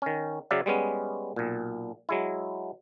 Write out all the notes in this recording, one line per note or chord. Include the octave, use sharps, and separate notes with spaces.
D#3 C#4
C#3 F#3 D5 E5 F5
G3 G#3 B3 C#4
B1 A#2
F#3 G#3 E4